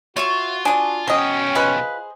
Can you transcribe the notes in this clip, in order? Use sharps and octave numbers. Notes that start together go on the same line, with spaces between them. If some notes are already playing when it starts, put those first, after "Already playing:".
F4 F#4 C#5 E5 C#6
D4 G#5 D#6
B1 F#3 C#4 D#5 G5
F4 G#4 B4 C5 D#5